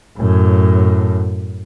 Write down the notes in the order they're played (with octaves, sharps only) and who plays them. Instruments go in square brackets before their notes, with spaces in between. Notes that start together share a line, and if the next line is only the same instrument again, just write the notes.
[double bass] F#2 A2